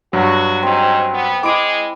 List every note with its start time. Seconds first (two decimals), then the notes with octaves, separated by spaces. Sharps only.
0.13 G2 F#3 F#4
0.63 G#2 C4
1.13 B3
1.43 G#3 E4 D6 D#6 D7